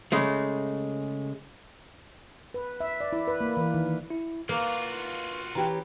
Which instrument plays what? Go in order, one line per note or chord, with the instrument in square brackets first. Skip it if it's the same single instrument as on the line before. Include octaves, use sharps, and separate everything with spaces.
[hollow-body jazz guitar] C#3 G#3 A3
[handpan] B4
E5
D5
E4
B4
A#3
E3
D#3
[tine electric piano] E4
[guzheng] A#3 [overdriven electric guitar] F4 F#4 [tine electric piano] B4
[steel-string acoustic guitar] E3 C#4 G4 [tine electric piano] A#5